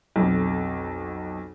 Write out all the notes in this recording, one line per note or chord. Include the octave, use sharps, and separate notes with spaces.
B1 F2